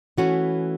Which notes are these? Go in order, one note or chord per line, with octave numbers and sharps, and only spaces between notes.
E3 A3 C#4 F#4